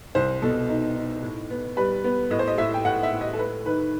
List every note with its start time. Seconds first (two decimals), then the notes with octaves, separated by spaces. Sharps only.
0.15 C2 C5
0.42 B2 A4
0.69 D#4
0.96 D#4
1.23 A2
1.50 B3
1.77 G3 B4
2.04 B3
2.31 A2 D#5
2.39 C5
2.47 D#5
2.58 A2 E5
2.74 G5
2.85 A2 F#5
3.03 E5
3.12 A2
3.21 D#5
3.33 A4
3.39 A3 B4
3.66 D#3 B4